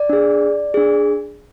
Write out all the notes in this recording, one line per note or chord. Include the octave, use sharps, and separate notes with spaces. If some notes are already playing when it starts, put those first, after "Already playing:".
Already playing: D5
D4 G#4
D4 G#4